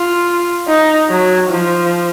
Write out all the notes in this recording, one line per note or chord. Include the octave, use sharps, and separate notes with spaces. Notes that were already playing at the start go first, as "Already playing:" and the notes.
Already playing: F4
D#4
F#3
F3